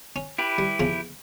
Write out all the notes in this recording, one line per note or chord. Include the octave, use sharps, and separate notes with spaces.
C#4
E4 G4 B4
G3
E2 C#3 F3